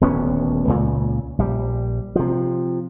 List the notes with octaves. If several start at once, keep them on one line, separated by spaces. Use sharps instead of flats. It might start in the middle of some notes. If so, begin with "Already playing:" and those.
D#1 D2 B3 C#4
C#2 A#2 C#3
A#1 G3
C3 F3